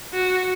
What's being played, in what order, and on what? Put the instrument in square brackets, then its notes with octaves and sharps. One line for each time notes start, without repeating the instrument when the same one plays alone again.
[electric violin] F#4